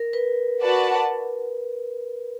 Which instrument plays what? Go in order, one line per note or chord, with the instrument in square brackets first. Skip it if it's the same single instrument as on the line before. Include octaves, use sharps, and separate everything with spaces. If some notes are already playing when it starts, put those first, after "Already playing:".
Already playing: [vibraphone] A#4
B4
[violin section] F#4 B4 D5 F#5 A5